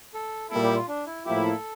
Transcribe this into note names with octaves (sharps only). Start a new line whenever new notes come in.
A4
A#2 G3 A#3 E4 A4
G4
F4
D4
E4
A2 F3 A#3 E4 G4
A4